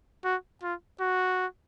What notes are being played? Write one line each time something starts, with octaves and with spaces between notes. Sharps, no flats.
F#4
F4
F#4